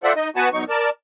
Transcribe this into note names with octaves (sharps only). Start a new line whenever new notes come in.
F4 A4 C5 D5 E5 F#5
D#4 D#5
B3 F#4 B4 F#5 G#5 A5
E2 F#3 D#4 C#6
A#4 D5 A5